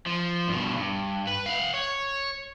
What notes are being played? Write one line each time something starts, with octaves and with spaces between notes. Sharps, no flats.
F3
G2 B2
G2
B4
F5 F#5
C#5